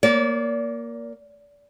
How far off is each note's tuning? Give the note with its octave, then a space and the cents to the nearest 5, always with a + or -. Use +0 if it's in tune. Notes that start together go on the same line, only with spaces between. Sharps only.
A#3 +5 D5 -35